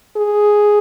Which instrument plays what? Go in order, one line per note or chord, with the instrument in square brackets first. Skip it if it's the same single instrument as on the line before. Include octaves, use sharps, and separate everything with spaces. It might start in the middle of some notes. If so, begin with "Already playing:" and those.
[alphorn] G#4